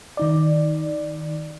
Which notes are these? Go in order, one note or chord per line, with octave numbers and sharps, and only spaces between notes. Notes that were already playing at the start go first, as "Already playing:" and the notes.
D#3 D#4 D5